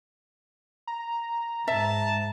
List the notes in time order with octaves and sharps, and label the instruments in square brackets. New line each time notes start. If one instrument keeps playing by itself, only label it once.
[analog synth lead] A#5
[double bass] G#2 [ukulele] E5 [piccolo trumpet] A5